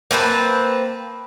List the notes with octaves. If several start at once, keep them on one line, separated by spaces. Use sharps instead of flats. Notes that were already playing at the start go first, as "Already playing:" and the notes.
A#3 C4 B4 A5